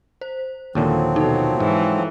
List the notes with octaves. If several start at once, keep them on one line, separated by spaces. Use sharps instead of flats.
C5
D#2 A#2 D3 F3 F#3 C4
B2 D#4 A4
G#2 E3